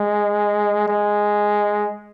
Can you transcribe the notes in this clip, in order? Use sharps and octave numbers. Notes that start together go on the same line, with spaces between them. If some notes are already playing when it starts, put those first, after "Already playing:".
Already playing: G#3
G#3